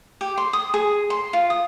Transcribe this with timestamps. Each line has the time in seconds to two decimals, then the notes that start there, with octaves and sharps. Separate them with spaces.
0.21 G4
0.38 C6
0.53 D#6
0.74 G#4
1.10 C6
1.33 F4
1.50 D#6